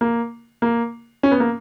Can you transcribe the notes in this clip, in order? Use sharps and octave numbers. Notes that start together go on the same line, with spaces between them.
A#3
A#3
C#4
B3
A#3